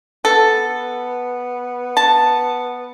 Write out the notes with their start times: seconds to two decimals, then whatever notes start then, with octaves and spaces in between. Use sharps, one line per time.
0.25 B3 A4
1.97 A5